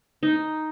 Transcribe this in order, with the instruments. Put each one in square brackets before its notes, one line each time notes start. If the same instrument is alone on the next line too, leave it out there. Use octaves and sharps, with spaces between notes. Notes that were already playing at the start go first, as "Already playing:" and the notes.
[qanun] D#4